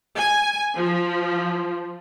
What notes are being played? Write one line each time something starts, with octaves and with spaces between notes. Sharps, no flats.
G#5
F3